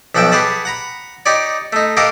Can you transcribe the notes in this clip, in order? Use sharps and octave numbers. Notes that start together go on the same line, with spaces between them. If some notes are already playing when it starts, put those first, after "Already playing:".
B1 F3 F#4 E5 G5
G4 G#4 B4 F#5 A5
F#5 A#5 B5
D#4 G4 C#5 D5
A3 D#4
G4 A4 A#4 D#5 F5 F#5